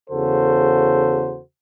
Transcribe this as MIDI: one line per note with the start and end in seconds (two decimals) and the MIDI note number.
0.10 1.41 40
0.10 1.41 49
0.10 1.41 66
0.10 1.41 69
0.10 1.41 72